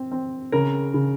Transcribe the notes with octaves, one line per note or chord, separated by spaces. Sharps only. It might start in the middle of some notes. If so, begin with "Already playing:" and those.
Already playing: C4
C4
C#3 A#4
C#3